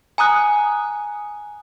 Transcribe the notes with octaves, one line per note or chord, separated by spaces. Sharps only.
G#5 A#5 D#6 F#6